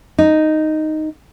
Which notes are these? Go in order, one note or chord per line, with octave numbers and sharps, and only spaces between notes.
D#4